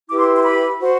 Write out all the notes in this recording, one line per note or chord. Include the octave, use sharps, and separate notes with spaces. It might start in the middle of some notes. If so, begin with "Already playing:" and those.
E4 G4 B4 D6
C6
C6
B5
F#4 C5